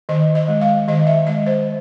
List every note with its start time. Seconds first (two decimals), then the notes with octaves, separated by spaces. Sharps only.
0.09 D#3 D#5
0.35 D#5
0.48 G#3
0.61 F5
0.88 D#3 D#5
1.07 E5
1.27 G#3 D#5
1.46 C5